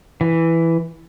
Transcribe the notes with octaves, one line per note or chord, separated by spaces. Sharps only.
E3